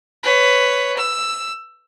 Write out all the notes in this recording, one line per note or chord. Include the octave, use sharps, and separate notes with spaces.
B4 C#5
E6